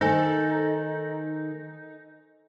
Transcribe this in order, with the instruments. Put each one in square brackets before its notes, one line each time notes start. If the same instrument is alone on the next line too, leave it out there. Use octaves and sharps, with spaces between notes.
[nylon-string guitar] D#3 A3 [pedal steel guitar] D#4 [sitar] A4 [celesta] C5 G#5